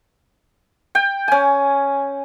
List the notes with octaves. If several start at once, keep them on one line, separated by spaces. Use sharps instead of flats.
G5
C#4 G#5